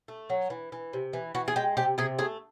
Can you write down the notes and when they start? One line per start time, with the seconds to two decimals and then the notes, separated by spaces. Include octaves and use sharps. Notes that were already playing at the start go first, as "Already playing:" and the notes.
0.08 A3
0.30 F#3
0.50 E3
0.72 E3
0.93 C3
1.13 E3
1.35 E3 F#4
1.48 G#4
1.56 G#3 G4
1.77 C3 G4
1.98 C3 G#4
2.19 A3 G#4